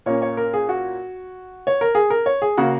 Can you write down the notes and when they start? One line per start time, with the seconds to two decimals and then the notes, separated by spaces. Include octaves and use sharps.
0.06 A#2 A#3 C#4 C#5
0.22 C#5
0.37 A#4
0.54 G#4
0.69 F#4
1.67 C#5
1.81 A#4
1.95 G#4
2.10 A#4
2.26 C#5
2.42 G#4
2.57 C#3 A#3 F#4